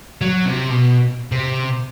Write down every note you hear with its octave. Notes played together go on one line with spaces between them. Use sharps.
F#3
C3
B2
C3